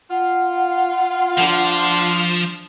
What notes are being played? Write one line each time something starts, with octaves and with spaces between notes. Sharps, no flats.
F4 F#5
F3 D4 C6